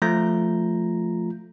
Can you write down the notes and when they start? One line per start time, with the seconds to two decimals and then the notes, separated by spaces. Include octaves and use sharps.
0.02 F3 A3 F4 A#5 G6 A#6